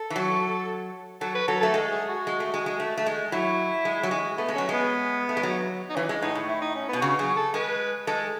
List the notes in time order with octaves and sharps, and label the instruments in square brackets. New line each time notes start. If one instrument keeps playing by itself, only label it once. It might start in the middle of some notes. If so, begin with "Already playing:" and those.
Already playing: [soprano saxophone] A4
[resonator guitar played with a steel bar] E3
F#3
[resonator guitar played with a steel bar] F#3 [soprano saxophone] A4
[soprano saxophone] B4
[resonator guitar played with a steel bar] F#3 [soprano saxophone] A4
[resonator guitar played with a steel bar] A3 [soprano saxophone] A4
[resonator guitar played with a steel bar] G#3 [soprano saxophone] A4
[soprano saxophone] G#4
F#4
[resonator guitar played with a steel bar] G#3
A3
G#3
G#3
A3
A3
G#3
[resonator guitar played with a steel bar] F#3 [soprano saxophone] E4
[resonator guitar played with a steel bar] G#3
F#3
G#3
[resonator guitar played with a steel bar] A3 [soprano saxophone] B3
[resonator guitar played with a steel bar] G#3
[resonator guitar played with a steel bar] F#3 [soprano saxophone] C#4
[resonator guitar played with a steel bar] G#3 [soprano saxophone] B3
[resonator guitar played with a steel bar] A3
G#3
F#3
[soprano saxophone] D#4
[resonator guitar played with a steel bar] E3 [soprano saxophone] C#4
[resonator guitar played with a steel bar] G#3
[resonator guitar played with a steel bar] A2 [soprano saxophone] D#4
[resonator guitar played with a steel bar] A2
[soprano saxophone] E4
D#4
C#4
B3
[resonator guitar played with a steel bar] B2
[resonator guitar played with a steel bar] C#3 [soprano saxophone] F#4
[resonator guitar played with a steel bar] F#3 [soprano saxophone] G#4
[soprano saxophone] A4
[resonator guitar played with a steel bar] G#3 [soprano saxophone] B4
[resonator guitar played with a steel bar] G#3 [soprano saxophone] A4